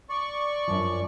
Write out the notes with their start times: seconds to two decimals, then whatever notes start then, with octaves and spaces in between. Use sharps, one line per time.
0.09 D5 C#6
0.68 F#2 F3